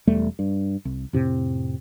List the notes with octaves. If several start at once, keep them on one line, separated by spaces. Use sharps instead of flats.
E1 E2 G3 A3
G2
C2
F2 A2 C3